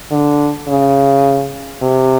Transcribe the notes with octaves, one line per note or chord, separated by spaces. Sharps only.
D3
C#3
C3